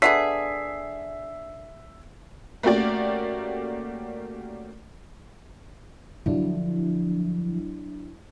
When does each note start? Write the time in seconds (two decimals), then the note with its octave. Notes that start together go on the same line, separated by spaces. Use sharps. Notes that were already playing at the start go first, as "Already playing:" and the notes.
0.02 D3 B3 G#4 E5 B6 C7
2.63 A3 A#3 C#4 F#4 G4 D5
6.26 D3 F3 F#3 D4 E4